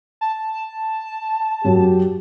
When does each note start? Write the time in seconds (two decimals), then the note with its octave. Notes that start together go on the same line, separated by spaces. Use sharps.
0.21 A5
1.65 F#2 F#3 G4